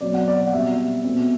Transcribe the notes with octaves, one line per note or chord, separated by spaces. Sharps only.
B2 F#3 C4 D5
F#5
D5
D5
F#5
B2 G3 C4 E5
B2 A3 C4